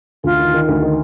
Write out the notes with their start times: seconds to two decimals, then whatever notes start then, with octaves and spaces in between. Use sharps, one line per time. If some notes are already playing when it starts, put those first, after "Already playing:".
0.24 D2 F4
0.39 D#3
0.54 D#3
0.68 D2
0.82 D#3